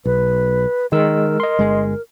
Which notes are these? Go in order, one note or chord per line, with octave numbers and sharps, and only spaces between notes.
B1 B4
D#3 G#3 A#4 E6
D#5 C6
G1 G#3